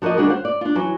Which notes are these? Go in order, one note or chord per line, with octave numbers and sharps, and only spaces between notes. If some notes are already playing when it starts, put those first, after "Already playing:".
F3 F#4 A#4 D5 D#5
D#3 G3 D4 F#4 G#4 A#4
C5 F5 F#5
D5
D4 F4
E3 F#3